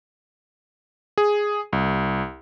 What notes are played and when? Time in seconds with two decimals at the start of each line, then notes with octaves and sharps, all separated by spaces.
1.18 G#4
1.73 C2